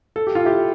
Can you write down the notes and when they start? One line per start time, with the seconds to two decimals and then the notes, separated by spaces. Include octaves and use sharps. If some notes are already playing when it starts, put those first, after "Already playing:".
0.16 A4
0.27 G4
0.35 F4
0.45 E4 G4